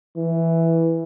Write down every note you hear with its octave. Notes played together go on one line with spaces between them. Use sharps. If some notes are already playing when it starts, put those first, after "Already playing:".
E3